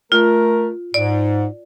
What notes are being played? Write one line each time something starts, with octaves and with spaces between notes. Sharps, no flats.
A3 F4 A#4
G#2 D5